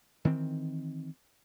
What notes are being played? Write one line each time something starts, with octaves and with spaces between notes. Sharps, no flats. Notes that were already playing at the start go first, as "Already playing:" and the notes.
D#3 E3 C4